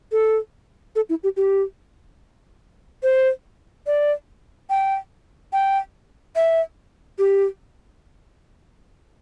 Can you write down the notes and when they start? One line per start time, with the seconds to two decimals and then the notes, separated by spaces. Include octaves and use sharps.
0.12 A4
0.96 A4
1.09 E4
1.23 G4
1.37 G4
3.03 C5
3.87 D5
4.70 G5
5.53 G5
6.36 E5
7.19 G4